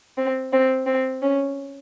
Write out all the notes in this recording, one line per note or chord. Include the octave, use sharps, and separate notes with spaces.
C4
C4
C4
C#4